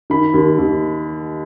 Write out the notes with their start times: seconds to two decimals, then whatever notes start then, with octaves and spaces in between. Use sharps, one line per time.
0.10 D#3 B5
0.34 D#2
0.59 D#2